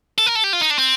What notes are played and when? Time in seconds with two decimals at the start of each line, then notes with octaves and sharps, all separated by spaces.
0.18 A4
0.26 A#4
0.35 A4
0.44 G4
0.53 F4
0.61 D#4
0.70 D4
0.79 C4